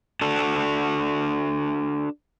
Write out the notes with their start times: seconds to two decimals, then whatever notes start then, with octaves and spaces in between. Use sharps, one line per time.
0.21 D4 F#4 A4